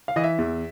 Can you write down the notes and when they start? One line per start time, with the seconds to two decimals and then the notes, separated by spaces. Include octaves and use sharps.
0.08 F5
0.16 E3 D#5
0.24 E5
0.38 E2